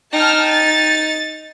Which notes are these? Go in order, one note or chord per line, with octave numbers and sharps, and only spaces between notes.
D#4 G5 A5 F6
A6